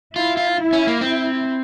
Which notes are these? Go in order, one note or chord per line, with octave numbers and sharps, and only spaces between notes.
E4 F4
F4
E4
C#4
A#3
C4 E4